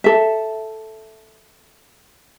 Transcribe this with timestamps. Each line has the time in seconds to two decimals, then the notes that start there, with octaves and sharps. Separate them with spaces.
0.04 A4 E5